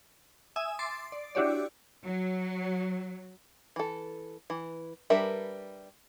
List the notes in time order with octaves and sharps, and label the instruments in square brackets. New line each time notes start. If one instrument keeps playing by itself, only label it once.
[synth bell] E5 G#5 D#6 E6
C6 D6 A6 C7
D5
D4 E4 F#4 G4 C#5 D5
[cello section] F#3
[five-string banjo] E3 A4
E3
G3 D4 A#4 B4 E5